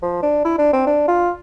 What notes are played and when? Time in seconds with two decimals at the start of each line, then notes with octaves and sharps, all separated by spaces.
0.02 F3
0.23 D4
0.45 E4
0.58 D4
0.73 C4
0.87 D4
1.08 F4